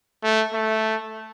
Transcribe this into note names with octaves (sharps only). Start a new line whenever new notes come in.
A3
A3